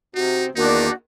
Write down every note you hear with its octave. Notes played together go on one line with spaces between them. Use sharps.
C3 D#4 F#4
E2 D#3 A#3 D4 D#4 F#4 D5